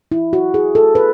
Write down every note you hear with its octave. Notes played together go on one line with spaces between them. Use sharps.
E4
F#4
G#4
A4
B4